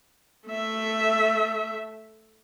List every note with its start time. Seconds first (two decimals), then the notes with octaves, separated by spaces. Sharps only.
0.49 A3 E5